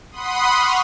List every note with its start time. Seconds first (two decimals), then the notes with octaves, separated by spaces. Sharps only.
0.11 F#5 B5 C6 D#6
0.53 C#6 F6